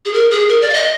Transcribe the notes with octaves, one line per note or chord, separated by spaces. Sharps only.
G#4
A#4
G#4
A#4
D5
F5
D#5